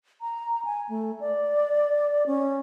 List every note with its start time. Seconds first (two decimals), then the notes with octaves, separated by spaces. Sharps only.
0.21 A#5
0.65 G#5
0.89 A3
1.20 D5
2.26 C#4